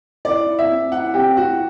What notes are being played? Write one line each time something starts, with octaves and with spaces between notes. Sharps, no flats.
E4 D5
E4
E5
C4
E4 F#5
C4 G4
E4 F#4